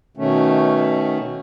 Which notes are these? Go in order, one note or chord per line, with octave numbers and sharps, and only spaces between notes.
B2 D#3 A3 C#4